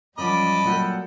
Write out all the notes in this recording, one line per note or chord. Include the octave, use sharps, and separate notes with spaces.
F#2 F3 G3 D#5 A5 B5 D6
A#2 F#3 A4 F#5 G5